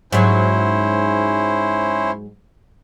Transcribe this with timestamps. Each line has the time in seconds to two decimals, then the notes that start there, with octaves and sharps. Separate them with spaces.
0.12 G#2 F#3 C#4 E4 C5